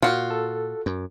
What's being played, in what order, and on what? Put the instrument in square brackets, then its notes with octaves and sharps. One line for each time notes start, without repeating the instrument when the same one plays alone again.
[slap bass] A#2 [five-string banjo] F4 F#4
[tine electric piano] A4
[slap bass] F#2